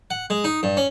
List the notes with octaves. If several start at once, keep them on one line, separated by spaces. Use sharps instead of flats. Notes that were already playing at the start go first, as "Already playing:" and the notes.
F#5
G#3
D#4
G2
C#4